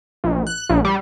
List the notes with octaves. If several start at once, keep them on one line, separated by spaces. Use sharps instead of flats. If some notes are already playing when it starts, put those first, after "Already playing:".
A#1
F#6
A#1
G3